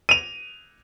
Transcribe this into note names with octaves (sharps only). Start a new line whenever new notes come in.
D#7 F7